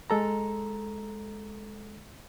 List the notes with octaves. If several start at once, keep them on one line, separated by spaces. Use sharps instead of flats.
G#3 A4 A#5